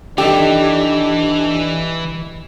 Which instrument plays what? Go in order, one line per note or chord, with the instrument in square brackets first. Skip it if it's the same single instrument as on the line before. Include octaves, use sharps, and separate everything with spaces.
[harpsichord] D#3 A4 [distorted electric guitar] E3 [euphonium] D4 [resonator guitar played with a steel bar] G4